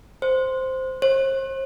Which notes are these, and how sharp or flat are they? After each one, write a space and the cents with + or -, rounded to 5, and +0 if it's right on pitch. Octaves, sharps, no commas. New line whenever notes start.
C5 -5
C5 +40